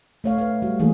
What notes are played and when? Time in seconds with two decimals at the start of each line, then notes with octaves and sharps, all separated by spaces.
0.24 A3 C#5 F5
0.38 B4 F5
0.62 G3 F#4
0.79 E3 A3 A#3 D#4 G#4